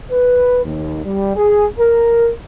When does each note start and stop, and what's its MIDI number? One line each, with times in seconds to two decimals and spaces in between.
0.11 0.60 71
0.65 1.00 39
1.05 1.34 55
1.36 1.65 68
1.79 2.29 70